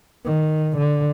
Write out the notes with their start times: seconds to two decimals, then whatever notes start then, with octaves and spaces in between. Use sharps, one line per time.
0.25 D#3
0.77 D3